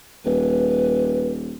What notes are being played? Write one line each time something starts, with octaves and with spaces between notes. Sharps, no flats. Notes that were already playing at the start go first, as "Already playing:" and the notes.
D#1 B4